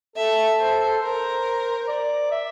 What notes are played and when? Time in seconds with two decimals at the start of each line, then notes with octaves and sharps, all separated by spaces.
0.16 A4 E5
0.59 C5
1.02 A#4 C5
1.79 C5
1.88 D5
2.31 E5